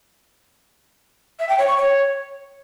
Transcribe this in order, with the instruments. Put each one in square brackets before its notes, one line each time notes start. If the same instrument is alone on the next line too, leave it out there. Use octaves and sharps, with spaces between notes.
[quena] E5
G5
C#5
C#6
C#5